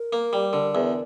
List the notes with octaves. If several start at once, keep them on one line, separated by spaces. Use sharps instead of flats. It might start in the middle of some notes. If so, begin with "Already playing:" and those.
Already playing: A#4
A#3
G3
D3
E2